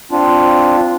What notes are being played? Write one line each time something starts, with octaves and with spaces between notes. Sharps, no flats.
C4 D4 F4